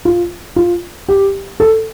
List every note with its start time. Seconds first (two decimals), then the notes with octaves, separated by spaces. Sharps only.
0.05 F4
0.56 F4
1.09 G4
1.60 A4